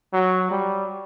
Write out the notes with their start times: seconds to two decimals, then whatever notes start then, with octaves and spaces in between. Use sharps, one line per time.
0.13 F#3
0.51 G3